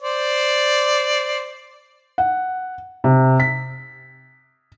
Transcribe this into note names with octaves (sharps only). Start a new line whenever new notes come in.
C5 D5
F#5
C3
B6